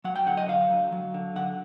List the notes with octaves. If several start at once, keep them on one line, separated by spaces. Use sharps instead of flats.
F#3 F#5
G5
D3 F#5
D#5
D3 F5
F#3
F#3
D3
D3 F#5